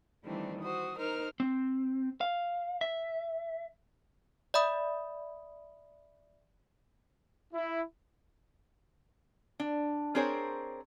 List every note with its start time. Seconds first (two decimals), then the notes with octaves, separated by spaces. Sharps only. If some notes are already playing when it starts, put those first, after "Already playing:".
0.24 D#3 E3 G3 A3 C4 D4
0.62 F#4 C5 D#6
0.97 D#4 A#4 C5 F6
1.40 C4
2.21 F5
2.81 E5
4.54 D5 E5 B5 D#6
7.54 E4
9.60 D4
10.15 C4 D4 G#4 A#4 C5 C#5